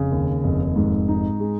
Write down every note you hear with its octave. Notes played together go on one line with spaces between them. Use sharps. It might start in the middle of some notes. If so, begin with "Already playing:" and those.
Already playing: F1 C#3
D#2
F1
G#2
D#4
G#3